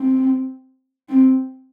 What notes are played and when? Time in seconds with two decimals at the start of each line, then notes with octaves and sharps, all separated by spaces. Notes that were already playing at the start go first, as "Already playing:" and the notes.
Already playing: C4
1.09 C4